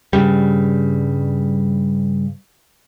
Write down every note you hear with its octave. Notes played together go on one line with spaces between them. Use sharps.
G2 C#3 G3